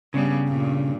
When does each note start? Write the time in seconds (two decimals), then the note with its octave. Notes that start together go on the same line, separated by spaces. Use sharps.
0.14 G2 C#3 G3 B3
0.47 G2 A#2